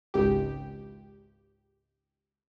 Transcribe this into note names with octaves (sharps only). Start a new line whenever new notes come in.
G#1 C#2 G4